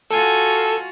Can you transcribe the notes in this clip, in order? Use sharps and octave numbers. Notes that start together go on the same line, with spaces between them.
F4 F#4 A4 G#5